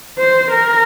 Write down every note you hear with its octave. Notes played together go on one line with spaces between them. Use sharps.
C5
A#4